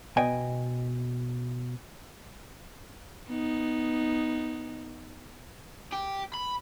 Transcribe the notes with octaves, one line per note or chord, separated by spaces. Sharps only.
B2 D#5 G5 G#5
B3 D#4
G4
B5